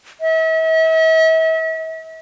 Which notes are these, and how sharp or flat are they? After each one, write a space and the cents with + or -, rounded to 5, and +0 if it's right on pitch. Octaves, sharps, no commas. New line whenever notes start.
E5 -40